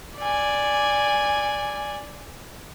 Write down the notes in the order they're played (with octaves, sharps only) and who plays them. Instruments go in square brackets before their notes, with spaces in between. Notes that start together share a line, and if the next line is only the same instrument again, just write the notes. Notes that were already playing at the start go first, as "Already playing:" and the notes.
[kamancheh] D5 G#5